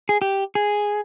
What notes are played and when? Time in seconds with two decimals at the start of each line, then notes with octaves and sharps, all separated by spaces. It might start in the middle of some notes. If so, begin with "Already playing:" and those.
0.09 G#4
0.22 G4
0.55 G#4